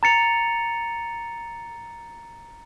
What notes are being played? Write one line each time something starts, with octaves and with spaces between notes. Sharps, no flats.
A#5 A6 C#7 F7